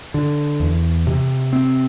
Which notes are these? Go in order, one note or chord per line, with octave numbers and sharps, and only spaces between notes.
D3
E2
C3
C4